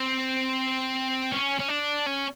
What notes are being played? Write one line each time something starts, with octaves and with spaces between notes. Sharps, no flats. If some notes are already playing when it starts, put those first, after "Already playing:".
Already playing: C4
C#4
C#4
D4
C#4